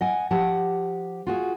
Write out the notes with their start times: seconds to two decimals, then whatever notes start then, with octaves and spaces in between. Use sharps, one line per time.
0.01 D#5 F#5 G#5
0.31 F3 G4 F#5 A5
1.27 F4 F#4 G#4